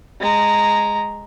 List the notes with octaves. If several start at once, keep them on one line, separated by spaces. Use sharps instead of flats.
G#3 A#5